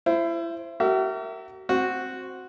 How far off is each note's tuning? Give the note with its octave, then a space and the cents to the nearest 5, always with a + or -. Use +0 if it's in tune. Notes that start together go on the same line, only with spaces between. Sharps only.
E4 +30 C5 +0
F#4 +45 A#4 -30 E5 +0
C4 +0 F#4 -5